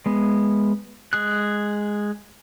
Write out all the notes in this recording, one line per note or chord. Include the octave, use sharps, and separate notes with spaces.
G#3 B3
G#3 G#4 F#6